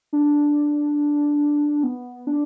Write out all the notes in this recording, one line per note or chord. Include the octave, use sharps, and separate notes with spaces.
D4
B3
D4